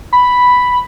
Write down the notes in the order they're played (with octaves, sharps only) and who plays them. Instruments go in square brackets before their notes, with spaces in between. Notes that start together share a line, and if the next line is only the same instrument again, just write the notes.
[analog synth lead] B5